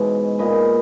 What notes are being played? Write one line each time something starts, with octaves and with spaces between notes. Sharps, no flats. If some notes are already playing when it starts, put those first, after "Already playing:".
Already playing: G#2 B2 E3 G#3 C#5
A#2 G#3 B4 D#5